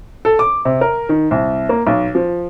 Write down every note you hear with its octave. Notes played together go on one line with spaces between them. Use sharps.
A4
D6
C3
A#4
D#3
C2
A#3
B1
F3